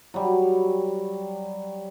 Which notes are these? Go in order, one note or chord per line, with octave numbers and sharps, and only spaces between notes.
F#3 G3